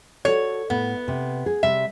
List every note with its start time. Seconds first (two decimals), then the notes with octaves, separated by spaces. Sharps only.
0.25 F#4 A4 C#5
0.70 A2 B3
1.08 C3
1.46 G#4
1.63 C3 G3 E5